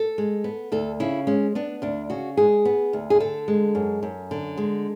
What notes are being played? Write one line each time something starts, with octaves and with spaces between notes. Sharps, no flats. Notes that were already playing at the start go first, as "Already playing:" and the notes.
Already playing: A4
G#3
B3
D2 A4
C#3 E4
G#3 C#4
B3 D4
D2 D4
C#3 F#4
G#3 G#4
B3
D2
G#4
D3 A4
G#3
F#2
F#2
D3
G#3